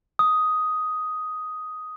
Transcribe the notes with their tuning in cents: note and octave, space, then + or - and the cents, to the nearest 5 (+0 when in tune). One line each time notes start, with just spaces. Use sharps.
D#6 +5